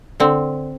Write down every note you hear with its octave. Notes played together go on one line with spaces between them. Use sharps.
D3 C4